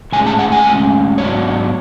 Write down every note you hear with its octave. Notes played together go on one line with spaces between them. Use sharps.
A2 G#3 C#4 G#5
A5
F#5
G#5
A2 G#3 C#4
G#2 F#3 B3 D4 C#5